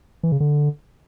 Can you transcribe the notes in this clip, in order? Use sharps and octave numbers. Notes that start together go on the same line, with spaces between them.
E3
C#3
D3